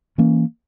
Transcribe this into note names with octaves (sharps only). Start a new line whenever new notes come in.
E3 A#3 C#4